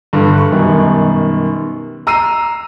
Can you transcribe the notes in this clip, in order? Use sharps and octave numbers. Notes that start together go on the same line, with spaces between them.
G2 D3 G3
C#6 F#6
F#2 B2 D#3 G3
A#5 E6 C7 D#7